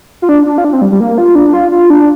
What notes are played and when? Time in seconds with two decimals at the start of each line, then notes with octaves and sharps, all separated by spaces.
0.22 F4
0.29 D4
0.46 D4
0.58 F4
0.65 D4
0.73 C4
0.82 G3
0.92 G3
1.00 A#3
1.18 F4
1.35 D4
1.53 F4
1.72 F4
1.90 D4